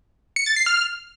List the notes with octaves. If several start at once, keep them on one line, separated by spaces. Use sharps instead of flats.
C#7
A6
C7
F6